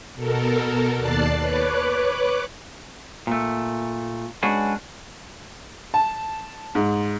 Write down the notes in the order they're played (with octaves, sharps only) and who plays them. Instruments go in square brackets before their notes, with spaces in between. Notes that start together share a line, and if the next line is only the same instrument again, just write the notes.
[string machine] B2 A4 A#4
D#2 D5 A5 F#6 A6 C7
B4 C#5 D6 F#6
[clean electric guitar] A#2 A3
G#3 C#4 D4 F#4 G#4 B4
[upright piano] A5
G#2